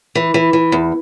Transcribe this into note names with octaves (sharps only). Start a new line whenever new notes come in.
E3
E3
E3
E2